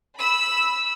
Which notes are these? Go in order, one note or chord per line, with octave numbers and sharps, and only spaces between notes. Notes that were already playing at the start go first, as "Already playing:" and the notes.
B5 E6